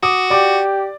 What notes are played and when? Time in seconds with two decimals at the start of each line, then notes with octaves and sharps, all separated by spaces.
0.03 F#4 D6 D#6
0.30 G4 D5 D6